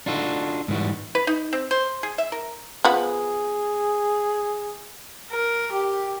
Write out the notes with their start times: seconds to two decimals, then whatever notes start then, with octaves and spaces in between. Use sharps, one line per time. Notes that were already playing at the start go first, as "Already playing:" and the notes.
0.06 D4 D#4 F4 F#4 A4
0.68 G#2 E3 G3 F#4
1.15 B4
1.27 D#4
1.53 C4
1.71 C5
2.03 G#4
2.18 E5
2.32 A#4
2.85 F3 B3 G#4
5.30 A#4
5.72 G4